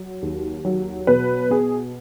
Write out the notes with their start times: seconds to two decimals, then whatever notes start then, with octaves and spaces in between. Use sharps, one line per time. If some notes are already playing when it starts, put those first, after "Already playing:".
Already playing: F#3
0.22 D#2
0.65 F#3
1.07 B2 B4
1.51 B3 G#4